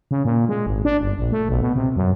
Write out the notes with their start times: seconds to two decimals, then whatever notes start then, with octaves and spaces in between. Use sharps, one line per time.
0.11 C#3
0.25 A#2
0.49 G#3
0.66 G#1
0.85 D4
1.01 G1
1.19 A#1
1.32 A3
1.49 B1
1.61 B2
1.75 C3
1.96 F#2